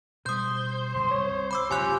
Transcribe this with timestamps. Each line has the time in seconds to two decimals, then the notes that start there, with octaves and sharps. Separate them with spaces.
0.26 B2 G3 C5 D#6 G6
0.94 F#1 C2 D3 C6
1.11 C2 C#5
1.51 B5 D6 E6
1.71 F#1 C#4 F4 G4 G#5 C6 F#6